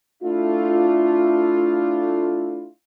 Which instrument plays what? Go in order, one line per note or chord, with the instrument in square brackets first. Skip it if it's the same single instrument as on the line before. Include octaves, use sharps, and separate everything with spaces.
[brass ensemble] A3 D4 E4 F4